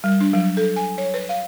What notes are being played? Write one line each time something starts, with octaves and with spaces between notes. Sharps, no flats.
G3
D4
F#3
A4
G#5
C#5
B4
F5